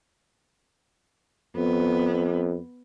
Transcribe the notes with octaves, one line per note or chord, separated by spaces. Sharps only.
F2 B3